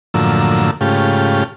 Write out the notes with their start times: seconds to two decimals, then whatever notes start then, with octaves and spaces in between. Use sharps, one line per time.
0.14 F#2 A2 D3 F3 A#3 E6
0.81 G#2 C#3 A3 F4 G4